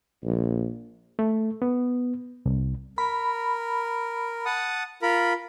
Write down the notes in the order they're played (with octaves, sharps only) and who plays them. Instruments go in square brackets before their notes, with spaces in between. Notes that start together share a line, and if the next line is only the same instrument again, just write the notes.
[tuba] A#1
[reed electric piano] A3
B3
C2
[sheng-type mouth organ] A#4 [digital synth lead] B5
[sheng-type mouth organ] F#5 A5 D#6
F4 A#4 B5